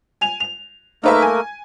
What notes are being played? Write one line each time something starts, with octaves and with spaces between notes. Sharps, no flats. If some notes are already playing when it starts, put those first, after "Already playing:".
G#5 F7
F7
A3 A#3 D#4 A#4 B4 E5
G#5